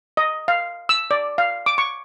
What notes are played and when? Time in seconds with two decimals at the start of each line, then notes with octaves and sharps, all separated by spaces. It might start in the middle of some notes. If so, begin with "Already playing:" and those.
0.17 D#5
0.48 F5
0.89 E6
1.11 D5
1.38 F5
1.66 D6
1.78 C#6